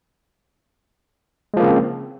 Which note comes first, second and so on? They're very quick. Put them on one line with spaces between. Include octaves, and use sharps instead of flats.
G#3 F3 A#3 C#3 C4